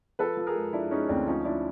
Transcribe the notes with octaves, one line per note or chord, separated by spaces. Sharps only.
F3 A4 B4
F3
G#4 A#4
G#3
F3 D4 E4
G#3 C#4 D#4
D2 C4 D4
F3 C#4 D#4
F3 D4 E4